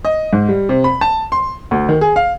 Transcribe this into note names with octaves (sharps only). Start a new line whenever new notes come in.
D#5
G#2
G3
C3
B5
A5
C6
D2
D#3
G#4
F5